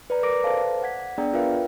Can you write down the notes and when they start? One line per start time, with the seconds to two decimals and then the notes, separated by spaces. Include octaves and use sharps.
0.10 B4 D5 A#5
0.23 A#4 D5 D6 A#6 D7
0.44 A4 B4 C5 F5 A5
0.83 F#5 G#6 B6
1.18 B3 D4 G#4 D5 G5 A#5
1.33 F4 A#4 B4 E5 F5 G5